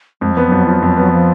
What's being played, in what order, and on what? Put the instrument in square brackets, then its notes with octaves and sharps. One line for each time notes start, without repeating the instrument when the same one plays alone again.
[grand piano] F2 [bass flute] G#3
[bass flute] F3 [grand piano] B3
[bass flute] F#3
[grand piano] F2
[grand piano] F3 [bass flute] F#3
[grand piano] F2 [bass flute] F#3
[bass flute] F#3 [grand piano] B3
[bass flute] F3